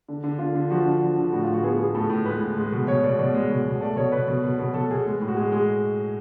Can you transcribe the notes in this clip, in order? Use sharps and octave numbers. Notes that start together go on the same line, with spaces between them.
D3
D3
D3 F4
D3
F3 F#4
D3
F3
D3
A2 F#4
A2 F4
F#4
B3 G#4
B3 G#4
A2 A4
A2
G#3 B4
A2
G#3
B2
B2 C#5
B2 D5
B2 D5
G#3
B2
B2
A3 D5
B2 C#5
B2 B4
B2
B2
B2
B2 A4
B2 G#4
G#3
A2
F#4
G#3 G#4
G#3 G#4